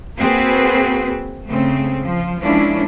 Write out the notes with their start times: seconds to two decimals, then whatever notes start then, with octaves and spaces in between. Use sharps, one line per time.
0.18 A#3 C4 F#4 G#4 B4
1.49 C#3 A3 C4
2.02 F3
2.41 F3 G#3 A#3 C#4 D4 E4